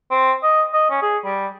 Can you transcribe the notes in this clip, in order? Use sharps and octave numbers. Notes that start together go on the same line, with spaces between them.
C4
D#5
D#5
C#4
G#4
G3